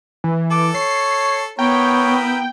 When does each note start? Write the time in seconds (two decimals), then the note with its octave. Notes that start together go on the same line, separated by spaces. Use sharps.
0.24 E3
0.51 A4 D6
0.75 C#5 C7
1.59 B3 E4 A#4 B4 C#5 G5